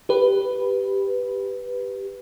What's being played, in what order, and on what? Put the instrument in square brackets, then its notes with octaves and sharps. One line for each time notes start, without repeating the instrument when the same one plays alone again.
[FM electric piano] G4 B4